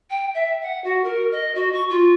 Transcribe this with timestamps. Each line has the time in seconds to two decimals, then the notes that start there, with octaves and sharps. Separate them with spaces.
0.10 G5
0.34 E5
0.62 F#5
0.84 F#4
1.04 A#4
1.31 D#5
1.55 F#4
1.73 C#6
1.90 F4